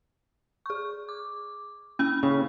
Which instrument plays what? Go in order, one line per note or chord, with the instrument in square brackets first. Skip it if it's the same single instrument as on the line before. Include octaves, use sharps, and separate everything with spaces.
[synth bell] G#4 C#6
D6
[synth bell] A#3 B5 E6 [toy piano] C#4
[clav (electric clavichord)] C#3